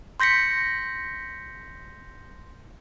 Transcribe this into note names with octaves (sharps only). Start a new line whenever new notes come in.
C6 G6 A#6 B6 C#7